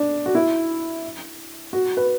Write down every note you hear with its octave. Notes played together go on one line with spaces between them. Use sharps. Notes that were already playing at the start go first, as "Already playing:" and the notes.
Already playing: D4
F#4
E4
F#4
B4